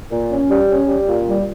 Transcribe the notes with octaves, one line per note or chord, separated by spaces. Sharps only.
A#2
C#4
G3
C#4
G3
A#2
G3